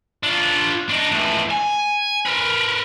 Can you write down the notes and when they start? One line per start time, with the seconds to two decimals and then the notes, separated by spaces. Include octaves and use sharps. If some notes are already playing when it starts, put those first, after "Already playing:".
0.23 D4 F4
0.90 D4 D#4
1.12 C#2 A2
1.51 G#5
2.26 A#4 B4